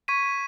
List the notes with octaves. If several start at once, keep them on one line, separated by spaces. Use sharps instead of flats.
C#6 G#6 B6 D#7